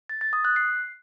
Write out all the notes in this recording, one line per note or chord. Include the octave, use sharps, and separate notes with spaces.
A6
A6
D#6
F#6
C7